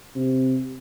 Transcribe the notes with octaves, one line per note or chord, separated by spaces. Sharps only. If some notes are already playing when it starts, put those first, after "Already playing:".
C3